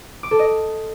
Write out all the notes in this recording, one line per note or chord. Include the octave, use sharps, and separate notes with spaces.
D6
A4
D#5